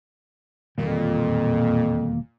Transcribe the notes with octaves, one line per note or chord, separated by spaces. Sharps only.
E1 F2 A#2 D#3 G3 A#3